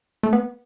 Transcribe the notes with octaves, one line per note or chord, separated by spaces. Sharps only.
A3
B3